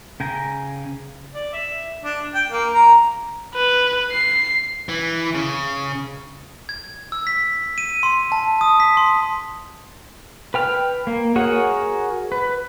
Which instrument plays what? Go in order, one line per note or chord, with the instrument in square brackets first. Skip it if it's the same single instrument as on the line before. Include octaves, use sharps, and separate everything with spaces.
[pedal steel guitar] C#3 G5 G#5 A#5
[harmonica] D5
E5
D4
G5
A#3
A#5
[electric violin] B4
C7
[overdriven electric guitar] E3
C#3
[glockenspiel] G#6
E6
B6
D#7
C6
A5
D#6
B6
C6
[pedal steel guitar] B4 G5 F6
A#3
F#4 G#4 A#4 C#5 F#5
B4